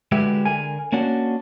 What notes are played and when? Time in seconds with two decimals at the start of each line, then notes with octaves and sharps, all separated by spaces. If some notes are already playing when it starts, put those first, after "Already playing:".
0.12 D3 G#3 F#4 G4 B4 E5
0.45 D3 A#4 G#5
0.92 A#3 C#4 D4 F#4